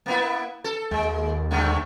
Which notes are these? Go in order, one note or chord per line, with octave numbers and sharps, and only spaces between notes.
A#3 B3 E4
A4
D#2 G#3
G2 D3 A3